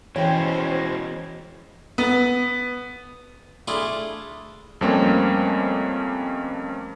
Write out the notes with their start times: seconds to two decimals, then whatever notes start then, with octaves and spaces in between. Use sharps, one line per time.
0.16 B2 E3 G#3 C#4 C5 C#5 G5
1.98 B3
3.68 A3 D4 E4 F4 G#4
4.81 F2 G3 A3 A#3 C4 C#4